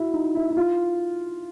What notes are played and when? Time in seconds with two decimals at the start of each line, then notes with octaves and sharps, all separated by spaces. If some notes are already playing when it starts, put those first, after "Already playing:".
Already playing: E4 F#4
0.14 D#4
0.35 E4
0.50 E4
0.57 F4